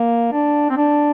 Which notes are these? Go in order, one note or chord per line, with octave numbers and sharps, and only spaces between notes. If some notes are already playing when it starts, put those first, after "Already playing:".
Already playing: A#3
D4
C4
D4